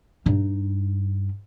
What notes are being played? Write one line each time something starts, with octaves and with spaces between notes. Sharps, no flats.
G2 D#4